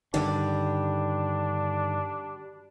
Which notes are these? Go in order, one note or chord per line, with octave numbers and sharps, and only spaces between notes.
G2 D3 D#3 G3 D4